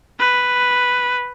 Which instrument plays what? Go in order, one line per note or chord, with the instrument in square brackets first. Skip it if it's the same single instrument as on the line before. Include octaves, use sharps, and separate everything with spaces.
[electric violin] B4